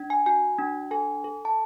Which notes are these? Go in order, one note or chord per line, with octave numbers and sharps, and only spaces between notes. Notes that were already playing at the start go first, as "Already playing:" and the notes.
Already playing: D4
G#5
F#4 G#5
D4
A4 G#5
A4
A5